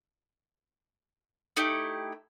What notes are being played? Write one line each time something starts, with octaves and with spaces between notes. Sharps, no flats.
A3 D#4 E4 G4